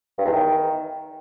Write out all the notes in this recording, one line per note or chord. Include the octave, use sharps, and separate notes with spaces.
G2
E2
D#3